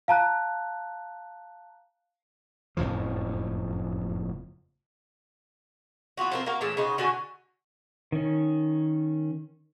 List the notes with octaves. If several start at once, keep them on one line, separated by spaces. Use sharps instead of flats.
F5 A5 A#5 F#6
F#1 F2 A2 F3
E3 B3 F4 F#4
F3 C4 A#4
A#3 F#4 A#4
A#2 C#3 E3 A3
C#3 F#3 D#4 C5
D3 F#4 G#5
D#3 C#4